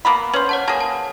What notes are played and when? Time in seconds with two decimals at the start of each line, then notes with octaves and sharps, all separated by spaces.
0.05 A#3 B3 B5
0.34 C#4 B4 C5
0.49 C#5 F#5 A5
0.68 A#3 G#4 A5
0.80 A5